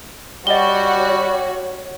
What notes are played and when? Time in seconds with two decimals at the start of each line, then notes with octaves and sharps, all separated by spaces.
0.47 G3 F#4 C#5 D#5 G7